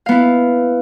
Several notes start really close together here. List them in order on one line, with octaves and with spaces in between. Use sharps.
F5 B3 E4